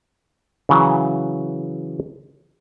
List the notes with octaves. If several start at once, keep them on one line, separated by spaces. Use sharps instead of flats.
C#3 E3 F#3